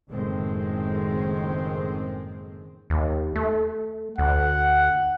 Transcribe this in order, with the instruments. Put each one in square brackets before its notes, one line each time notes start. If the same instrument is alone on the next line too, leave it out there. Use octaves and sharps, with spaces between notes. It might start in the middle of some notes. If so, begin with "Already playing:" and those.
[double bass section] F#1 A2 D#3 G#3 C4
[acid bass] D#2
A3
[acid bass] D2 [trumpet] F#5